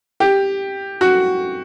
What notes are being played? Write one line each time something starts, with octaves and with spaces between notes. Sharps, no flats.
G4
F#4